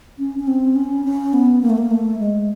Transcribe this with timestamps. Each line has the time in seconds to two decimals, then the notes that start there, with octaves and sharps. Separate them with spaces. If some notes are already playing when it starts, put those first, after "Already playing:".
0.19 C#4
0.39 C#4
0.47 C4
0.76 C#4
1.04 C#4
1.33 B3
1.62 A#3
1.70 A3
1.78 A#3
1.91 A3
2.19 G#3